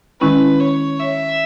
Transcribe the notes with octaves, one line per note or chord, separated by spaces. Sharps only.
D#3 G#3 C#4 E4 B4
C#5
E5